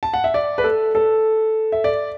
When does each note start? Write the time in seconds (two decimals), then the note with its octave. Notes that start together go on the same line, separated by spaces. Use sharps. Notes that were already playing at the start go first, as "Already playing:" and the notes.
0.03 A5
0.14 F#5
0.24 E5
0.34 D5
0.58 B4
0.64 A4
0.95 A4
1.72 E5
1.84 D5